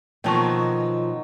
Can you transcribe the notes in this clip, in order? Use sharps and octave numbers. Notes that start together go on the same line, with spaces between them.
B2 D#3 F3 F#3 A#3 G5 A5 C#6